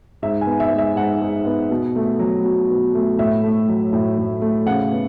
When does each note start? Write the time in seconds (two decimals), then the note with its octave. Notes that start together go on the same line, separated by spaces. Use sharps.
0.22 G#2 E5
0.41 G#5
0.47 B3
0.60 E5
0.71 G#3
0.78 E5
0.96 G#2 F#5
1.22 G#2
1.46 B3
1.70 B2
1.96 A3
2.19 F#3
2.45 B2
2.70 B2
2.95 A3
3.19 A2 E5
3.43 A3
3.68 F#3
3.93 A2
4.18 A2
4.42 A3
4.66 C#3 F#5
4.92 B3